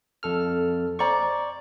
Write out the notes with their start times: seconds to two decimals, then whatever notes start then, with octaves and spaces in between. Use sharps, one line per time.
0.23 F2 A4 F6
0.99 C5 D5 D#5 A#5 C#6